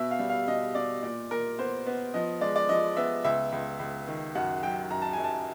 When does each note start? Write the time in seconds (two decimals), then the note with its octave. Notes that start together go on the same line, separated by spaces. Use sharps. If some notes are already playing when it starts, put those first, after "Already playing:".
Already playing: B2 E5
0.11 F5
0.19 G3
0.30 F5
0.47 B2 D#5
0.75 B2 D5
1.03 A#2 D5
1.30 A#2 A#4
1.58 B3 C5
1.86 B3
2.14 F3 D#5
2.41 G#3 D5
2.56 D5
2.69 F3 D#5
2.97 B3 E5
3.24 C#2 E5
3.52 C#2
3.79 C#2
4.08 D#3
4.35 F#2 F#5
4.63 F#3 G5
4.90 F#2 A#5
5.02 A5
5.13 G#5
5.18 F#2
5.24 A5